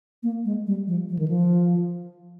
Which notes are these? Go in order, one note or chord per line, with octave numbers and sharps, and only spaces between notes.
A#3
G#3
G3
F3
F3
D#3
F3